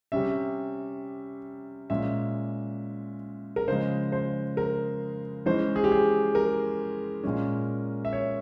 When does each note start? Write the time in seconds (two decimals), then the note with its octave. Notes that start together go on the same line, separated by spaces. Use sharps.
0.12 C3 G3 C#4 E5
1.90 A#2 G#3 C#4 E5
3.56 A#4
3.68 C#3 F3 G#3 C5
4.12 C5
4.57 A#4
5.46 E3 G#3 C#4 C5
5.76 G#4
5.84 G4
5.92 G#4
6.35 A#4
7.24 A#2 G#3 C#4
8.05 E5
8.13 C#5